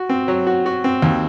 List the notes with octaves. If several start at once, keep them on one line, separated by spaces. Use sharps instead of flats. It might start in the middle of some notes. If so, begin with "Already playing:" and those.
Already playing: F#4
C4
F#3
F#4
F#4
C4
D#2